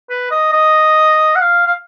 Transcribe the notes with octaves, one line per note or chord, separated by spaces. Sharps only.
B4
D#5
D#5
F#5
F5
F5